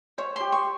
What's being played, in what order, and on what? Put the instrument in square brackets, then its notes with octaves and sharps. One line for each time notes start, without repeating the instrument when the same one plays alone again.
[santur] C5 [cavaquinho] C#5
[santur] G4 [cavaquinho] C6
[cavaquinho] C#6